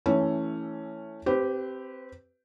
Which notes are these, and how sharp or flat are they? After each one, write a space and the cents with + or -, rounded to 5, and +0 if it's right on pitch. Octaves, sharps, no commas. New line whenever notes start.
E3 -5 A3 +10 C#4 +0
C4 +0 G4 -10 B4 +20